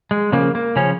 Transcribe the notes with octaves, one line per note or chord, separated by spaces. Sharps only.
G#3
C#3 F3 A#3
A#3
C#3 F3 C#4